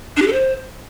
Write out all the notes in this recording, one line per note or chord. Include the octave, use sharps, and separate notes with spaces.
D4
G4
A4
C5